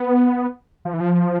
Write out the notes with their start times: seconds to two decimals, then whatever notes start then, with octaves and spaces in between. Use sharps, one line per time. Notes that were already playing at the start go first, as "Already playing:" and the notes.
Already playing: B3
0.85 F3
0.93 E3
1.00 F3